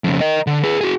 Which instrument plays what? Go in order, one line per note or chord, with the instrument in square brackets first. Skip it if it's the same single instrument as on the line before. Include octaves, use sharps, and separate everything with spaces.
[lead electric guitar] F2 C#3
A#4 D#5
D3
G#4 B4
F#4 G#4